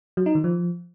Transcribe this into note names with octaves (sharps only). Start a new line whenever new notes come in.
F#3
D#4
D#3
F3